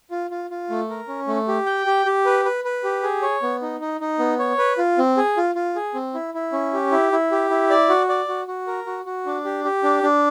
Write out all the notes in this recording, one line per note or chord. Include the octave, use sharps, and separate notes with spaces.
F4
F4
F4
A3
A#4
C#4
A3
G4
G5
G4
G4
B4
B4
B4
G4
G#4
C#5
B3
D#4
D#4
D#4
B3
C#5
B4
F4
C4
G#4
F4
F4
G#4
C4
E4
E4
C#4
G4
E4
E4
G4
E4
D5
F#4
D5
F#4
F#4
A#4
F#4
F#4
D4
G4
G4
D4
D4